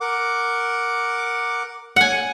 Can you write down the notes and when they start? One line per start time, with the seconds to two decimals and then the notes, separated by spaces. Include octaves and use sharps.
0.01 A#4 F#5 D6
1.96 F#5 G#5